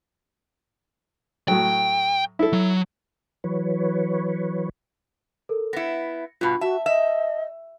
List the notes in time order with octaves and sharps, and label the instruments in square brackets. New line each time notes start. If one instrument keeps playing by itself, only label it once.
[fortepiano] A2 F#3 [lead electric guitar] G5
[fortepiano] E4 A4
[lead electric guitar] F#3
[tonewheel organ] E3 F#3 B4 C#5
[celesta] A4 A#4
[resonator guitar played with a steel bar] B3 E4 [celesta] A#6 C#7
[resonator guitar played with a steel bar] G2 B2 [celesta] F4 B5
[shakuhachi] F#4 [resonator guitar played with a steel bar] E5 [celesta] A5
[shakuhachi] D#5 [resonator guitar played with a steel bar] E5